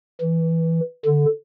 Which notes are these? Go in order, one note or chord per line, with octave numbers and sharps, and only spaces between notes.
E3
D3